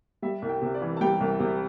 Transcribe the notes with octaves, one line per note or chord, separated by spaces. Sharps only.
G3 E5
C2
G5
C3
D5
E3
A5
G3 G5
C2
C3